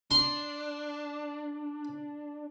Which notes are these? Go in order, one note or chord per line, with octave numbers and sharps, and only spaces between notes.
D4 C6